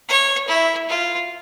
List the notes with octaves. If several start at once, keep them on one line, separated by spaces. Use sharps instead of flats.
C#5
E4
F4